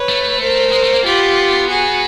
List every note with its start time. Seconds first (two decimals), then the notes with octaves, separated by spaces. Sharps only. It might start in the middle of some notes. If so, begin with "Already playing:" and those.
Already playing: B4 C#5
0.09 A3
0.41 A#4 C5
0.72 G#3
0.83 A3
0.94 A#3
1.04 B3 F4 G4
1.68 F#4 G#4